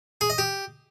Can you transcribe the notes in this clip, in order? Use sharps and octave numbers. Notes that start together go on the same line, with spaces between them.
G#4
D#5
G4